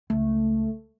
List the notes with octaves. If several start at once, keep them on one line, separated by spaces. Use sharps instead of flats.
C#2 A3